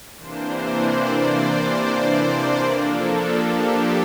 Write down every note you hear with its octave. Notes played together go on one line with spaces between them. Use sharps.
C3 E3 A#3 D4 C5
D5
C5
C5
C5
F3 A#3 D4 A4
G4